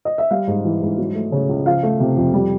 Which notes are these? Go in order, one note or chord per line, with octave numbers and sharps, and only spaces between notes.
D#5
E5
G3 F5
G#2
E3
G#2
F#3
A3
C#3
C#2
F3 F5
A3
C3
F2
G3